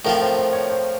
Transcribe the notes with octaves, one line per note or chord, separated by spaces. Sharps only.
A2 F3 C4 A#4
C5
C5
C#5
C5